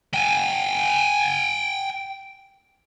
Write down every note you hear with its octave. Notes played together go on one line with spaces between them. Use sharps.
G5 G#5